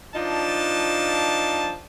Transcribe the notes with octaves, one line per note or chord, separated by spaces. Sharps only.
F3 D4 D#4 F4 A5